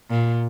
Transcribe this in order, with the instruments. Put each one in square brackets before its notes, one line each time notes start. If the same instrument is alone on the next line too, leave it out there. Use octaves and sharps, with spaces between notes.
[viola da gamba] A#2